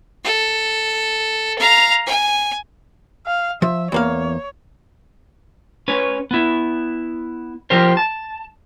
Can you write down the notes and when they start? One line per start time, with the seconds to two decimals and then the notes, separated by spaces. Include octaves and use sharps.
0.25 A4
1.59 F5 A#5
2.06 G#5
3.26 F5
3.62 F3 E5
3.92 E2 A#3 C#5 F5
5.88 C#4 B4 C#5
6.31 B3 E4
7.70 F3 F4 G4 A#4 C5
7.97 A5